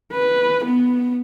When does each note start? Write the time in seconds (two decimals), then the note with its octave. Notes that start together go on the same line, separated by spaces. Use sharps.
0.13 B4
0.65 B3